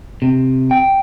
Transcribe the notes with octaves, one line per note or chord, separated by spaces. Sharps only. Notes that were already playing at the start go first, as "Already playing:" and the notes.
C3
G5